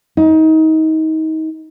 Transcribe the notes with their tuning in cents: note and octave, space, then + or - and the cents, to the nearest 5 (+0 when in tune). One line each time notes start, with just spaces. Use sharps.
D#4 +30